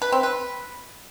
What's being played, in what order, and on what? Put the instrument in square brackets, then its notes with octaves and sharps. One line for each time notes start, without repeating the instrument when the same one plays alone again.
[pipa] B4
C4
B4